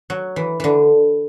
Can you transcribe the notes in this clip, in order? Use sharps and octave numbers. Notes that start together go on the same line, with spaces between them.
F#3
E3
D3 E3